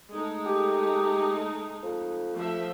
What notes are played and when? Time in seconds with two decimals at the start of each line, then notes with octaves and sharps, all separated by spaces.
0.10 G#3 A3 D#4
0.46 G4
1.83 F2
2.34 F3 A3 E5